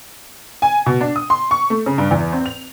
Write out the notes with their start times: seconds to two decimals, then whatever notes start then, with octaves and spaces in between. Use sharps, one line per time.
0.62 G#5
0.86 B2
1.01 D4
1.16 D#6
1.30 C6
1.51 C#6
1.70 A3
1.86 C#3
1.98 G2
2.11 E2
2.33 C4
2.46 F7